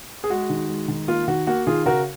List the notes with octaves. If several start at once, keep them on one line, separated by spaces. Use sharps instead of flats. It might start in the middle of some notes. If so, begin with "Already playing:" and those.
G#4
G#3 F#4
D#3
G#3
D#3
A#3 F4
D#3 F#4
A#3 F#4
D#3 F4 G#4
C#3 F#4 A#4